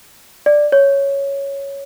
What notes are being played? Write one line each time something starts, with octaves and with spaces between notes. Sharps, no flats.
D5
C#5